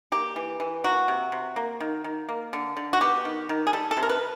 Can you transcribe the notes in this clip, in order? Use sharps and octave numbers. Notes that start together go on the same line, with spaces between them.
A#3 G4
E3
E3
A#3 F#4
C3
C3
A#3
D#3
D#3
A#3
D3
D3
F#4
B3 G4
D#3
D#3
G#4
G3 A4
A4
C3
A#4
B4